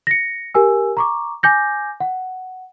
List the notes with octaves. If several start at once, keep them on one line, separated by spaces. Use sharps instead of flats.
A#6 C#7
G4 A#4 G#5 E6
A#5 C#6 D6
G#5 D6 G6 A#6
F#5